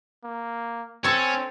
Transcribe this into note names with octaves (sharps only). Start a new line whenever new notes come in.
A#3
C4 C#4 A4 C#5